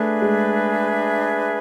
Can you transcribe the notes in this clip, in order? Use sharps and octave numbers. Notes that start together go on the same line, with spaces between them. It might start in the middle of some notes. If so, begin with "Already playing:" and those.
Already playing: A3 D4 G#4 B4 E5
G#3